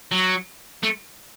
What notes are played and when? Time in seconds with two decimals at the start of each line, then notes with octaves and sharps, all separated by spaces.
0.11 F#3
0.83 A3